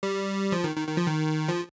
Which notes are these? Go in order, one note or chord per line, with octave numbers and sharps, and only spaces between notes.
G3
F3
D#3
D#3
D#3
F3
D#3
F3